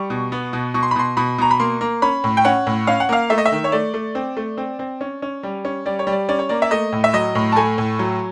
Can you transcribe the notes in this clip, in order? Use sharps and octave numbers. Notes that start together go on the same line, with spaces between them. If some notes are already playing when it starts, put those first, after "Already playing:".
Already playing: G3 C#6
B2
B3
B2
B2 C#6
C6
B5
B2 C6
B2 B5
B2 A#5
B5
A#3 C6
A#3
C#4 B5
A2
G5
C#4 F#5
A2
C#4 F5
F#5
A#3 F5
A3 E5
D#5
E5
D#3
C#5
A3 D5
A3
C4
A3
C4
C4
C#4
C#4
G3
C#4
G3 D5
C#5
G3
D5
C#4 D5
C#5
A#3 D5
E5
A3 D#5
A2
E5
F#3 D#5
A2
A5
A3 G#5
A2
F#3